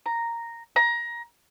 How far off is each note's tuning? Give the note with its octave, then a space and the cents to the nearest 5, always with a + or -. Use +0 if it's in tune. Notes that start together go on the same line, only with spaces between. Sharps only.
A#5 -5
A#5 +20